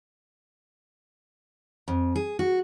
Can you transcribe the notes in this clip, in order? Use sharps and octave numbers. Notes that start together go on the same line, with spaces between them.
F2
G#4
F#4